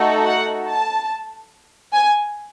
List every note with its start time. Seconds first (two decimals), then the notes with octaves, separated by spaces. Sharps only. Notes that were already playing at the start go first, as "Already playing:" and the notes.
Already playing: A3 D#4 F#4 A4
0.28 F#5
0.70 A5
1.94 G#5